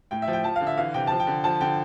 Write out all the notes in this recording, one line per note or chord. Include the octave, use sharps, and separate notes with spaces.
A2 G5
E5
F3
G5
F3 A5
F5
D3
E5
E3 F5
C3 G5
F3 A5
G5
D3
F3 A5
D3 G5